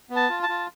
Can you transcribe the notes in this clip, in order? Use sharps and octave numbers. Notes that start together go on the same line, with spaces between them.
B3
A5
F4
A5
F4